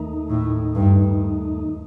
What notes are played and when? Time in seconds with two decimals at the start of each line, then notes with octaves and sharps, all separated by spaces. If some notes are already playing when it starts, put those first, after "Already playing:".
Already playing: D#2 D#3 A3 D#4
0.29 A2
0.75 G2